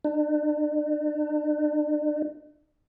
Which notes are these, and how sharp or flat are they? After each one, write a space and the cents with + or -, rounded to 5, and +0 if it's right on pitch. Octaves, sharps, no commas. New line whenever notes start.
D4 +40